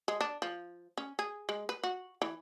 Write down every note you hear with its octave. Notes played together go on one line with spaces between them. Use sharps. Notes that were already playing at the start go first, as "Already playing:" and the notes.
G#3
D4
F3
C#4
G#4
G#3
B4
F#4
E3